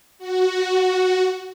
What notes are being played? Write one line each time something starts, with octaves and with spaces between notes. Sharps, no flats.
F#4